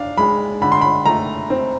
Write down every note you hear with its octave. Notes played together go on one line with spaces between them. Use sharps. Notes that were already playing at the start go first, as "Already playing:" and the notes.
Already playing: D4 F5
G#3 B5
D3 B5
C6
B5
A3 A#5
C4